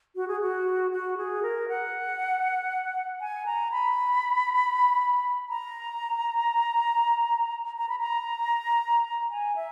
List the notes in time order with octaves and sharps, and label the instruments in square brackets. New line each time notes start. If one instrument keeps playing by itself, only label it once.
[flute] F#4
G#4
F#4
F#4
G#4
A#4
F#5
G#5
A#5
B5
A#5
A#5
B5
A#5
G#5
E5